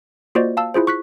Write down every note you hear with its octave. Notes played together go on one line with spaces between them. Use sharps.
A#3 F4 F#4 C5 D5 D#5
F5 A5 E6
E4 F4 G#4 C5
C#6 F#6 B6